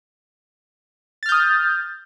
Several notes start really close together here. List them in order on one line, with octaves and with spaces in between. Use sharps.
A6 F6 G6 D#6